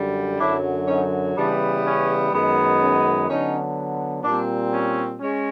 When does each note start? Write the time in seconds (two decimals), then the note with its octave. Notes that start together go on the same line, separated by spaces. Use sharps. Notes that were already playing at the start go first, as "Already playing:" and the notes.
Already playing: F#2 D3 G3
0.39 F#2 D3 F#3 D4 E4
0.87 C#4 D#4
1.36 C#3 E3 G3 B3 D4
1.85 C#4
2.32 F#2 D#3 G#3 B3
2.80 C#4
3.28 D3 F#3 B3 C#4 D#4
4.24 A#2 G3 C4 D4
4.73 C#4
5.20 G#3 C#4